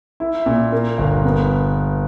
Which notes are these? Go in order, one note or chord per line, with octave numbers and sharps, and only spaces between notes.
E4
A#2
A#3
G1
B3